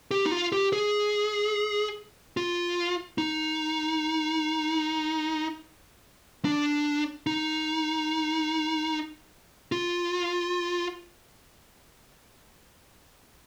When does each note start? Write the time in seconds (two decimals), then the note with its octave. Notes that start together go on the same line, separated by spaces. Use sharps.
0.11 G4
0.26 D#4
0.32 F4
0.52 G4
0.73 G#4
2.37 F4
3.18 D#4
6.45 D4
7.27 D#4
9.72 F4